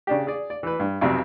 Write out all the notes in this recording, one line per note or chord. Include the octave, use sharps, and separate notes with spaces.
C#3 D4 G4
G#4 D5
D5
E3 B4
G2
B1 F2 C3 C4